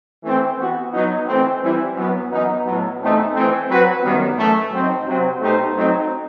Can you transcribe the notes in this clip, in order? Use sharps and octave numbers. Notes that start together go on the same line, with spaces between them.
E3 A3 C4
E3 B3 F#4
F#3 B3 D#4
E3 A3 C4
E3 G3 C4 E4
F#2 F#3 B3
F#2 E3 B3 D#4
A2 F#3 B3
E2 B2 A3 C4 D#4
E3 A3 C4
F#3 C4 F#4 B4
F#2 D#3 G3 B3
F#2 E3 A3
F#2 F#3 C4 D#4
C3 F#3 C4
B2 A3 D#4 G4 C5
F#3 A3 C4 D#4